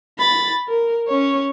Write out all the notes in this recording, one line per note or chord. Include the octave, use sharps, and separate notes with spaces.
B5 A6
A#4
C#4 C#5